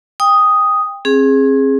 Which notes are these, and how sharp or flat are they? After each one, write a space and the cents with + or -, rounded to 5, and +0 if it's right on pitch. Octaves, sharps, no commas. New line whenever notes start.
G5 +25 D#6 +0
C4 +40 G#4 +0